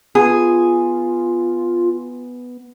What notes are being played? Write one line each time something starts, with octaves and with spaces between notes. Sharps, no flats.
B3 F4 G#4